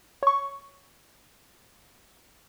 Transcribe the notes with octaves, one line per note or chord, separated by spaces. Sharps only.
C#5 C#6